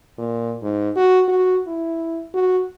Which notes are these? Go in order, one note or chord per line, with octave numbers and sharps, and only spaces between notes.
A#2
G#2
F#4
F#4
E4
F#4